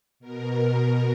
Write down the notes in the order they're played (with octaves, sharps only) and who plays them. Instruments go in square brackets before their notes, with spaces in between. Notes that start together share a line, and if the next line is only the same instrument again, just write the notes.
[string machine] B2 A#4